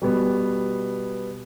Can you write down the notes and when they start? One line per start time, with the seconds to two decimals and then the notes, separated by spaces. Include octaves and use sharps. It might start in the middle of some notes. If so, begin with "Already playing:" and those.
0.02 B2 G3 B3